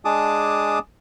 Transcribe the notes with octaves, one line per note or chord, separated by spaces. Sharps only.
G#3 D4 G#4 A5 D6 D#6